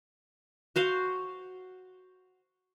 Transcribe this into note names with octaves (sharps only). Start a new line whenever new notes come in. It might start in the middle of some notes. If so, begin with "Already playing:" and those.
F#4 C5 F5